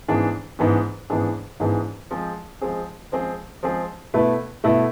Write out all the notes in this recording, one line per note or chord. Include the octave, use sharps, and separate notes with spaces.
G#2 E3 B3 D4 G#4
G#2 E3 B3 D4 G#4
G#2 E3 B3 D4 G#4
G#2 E3 B3 D4 G#4
F3 G#3 C4 G#4
F3 G#3 C4 G#4
F3 G#3 C4 G#4
F3 G#3 C4 G#4
B2 A3 E4 B4
B2 A3 E4 B4